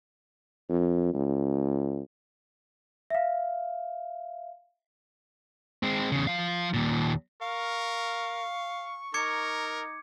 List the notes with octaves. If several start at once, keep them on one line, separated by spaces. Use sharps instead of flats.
F2
C#2
E5 F5
G#3 C4
E2 C#3
F3 F5
D#2 A#2
A#4 F5 C#6
D#4 A#4 D6 G#6 C#7